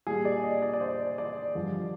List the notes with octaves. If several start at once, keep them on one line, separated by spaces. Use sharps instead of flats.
A#2 G3 G#4
D5
D#5
D5
D5
C5
D5
G2 D3 F3